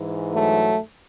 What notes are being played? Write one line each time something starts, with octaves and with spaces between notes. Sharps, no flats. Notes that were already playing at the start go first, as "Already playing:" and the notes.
Already playing: G#2 E3
F#3 A3